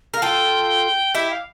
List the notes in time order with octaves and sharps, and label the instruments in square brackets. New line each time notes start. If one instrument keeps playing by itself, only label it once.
[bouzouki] A#4
[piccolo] F5
[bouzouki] F4 A4 [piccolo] G5
[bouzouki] E4 G4 [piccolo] E5
[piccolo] F5